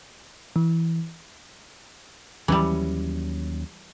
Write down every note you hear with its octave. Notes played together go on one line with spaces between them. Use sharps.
E3
D#2 E3 F#3 G3 C#4